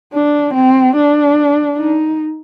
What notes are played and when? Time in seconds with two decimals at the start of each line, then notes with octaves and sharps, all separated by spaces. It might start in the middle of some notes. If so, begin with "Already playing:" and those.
0.13 D4
0.53 C4
0.96 D4
1.77 D#4